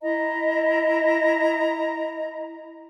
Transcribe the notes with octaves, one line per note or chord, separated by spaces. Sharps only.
E4 D#5 A#5